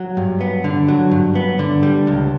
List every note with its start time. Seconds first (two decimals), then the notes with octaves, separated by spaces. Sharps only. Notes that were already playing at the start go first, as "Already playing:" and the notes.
Already playing: F#3
0.17 G2
0.41 B3
0.64 D3
0.88 F#3
1.11 G2
1.35 B3
1.59 D3
1.83 G3
2.07 C#2